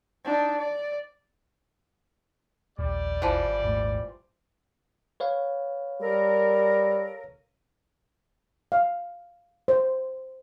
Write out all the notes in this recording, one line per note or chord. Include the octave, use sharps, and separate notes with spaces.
D4 D#4
D5
D#1 A#1 G3 D5
G#1 E3 F3
D#1 G#2 A3
B4 C#5 F5
G3 A4 A#4
F5
C5